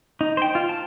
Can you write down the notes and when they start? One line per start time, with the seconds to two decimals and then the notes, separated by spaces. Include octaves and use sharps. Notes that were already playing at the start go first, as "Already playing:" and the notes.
0.21 D#4
0.37 C5 G5
0.55 F4
0.69 A5